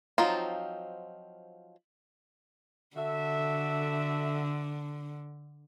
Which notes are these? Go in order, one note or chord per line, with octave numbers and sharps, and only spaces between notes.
F3 F#3 C4 D#4 F4
D3 F#4 A4 E5